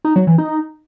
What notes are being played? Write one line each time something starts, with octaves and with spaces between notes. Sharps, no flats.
D#4
F#3
E3
D#4